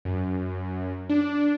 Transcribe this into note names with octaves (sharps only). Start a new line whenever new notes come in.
F#2
D4